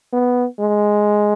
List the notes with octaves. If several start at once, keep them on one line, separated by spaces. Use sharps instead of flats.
B3
G#3